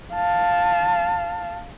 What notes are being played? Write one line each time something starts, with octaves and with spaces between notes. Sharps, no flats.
F5 A5